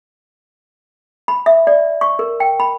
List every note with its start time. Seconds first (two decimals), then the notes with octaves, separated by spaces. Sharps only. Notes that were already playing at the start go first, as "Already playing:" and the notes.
1.28 B5
1.46 E5
1.67 D5
2.01 C#6
2.19 A#4
2.40 G5
2.60 B5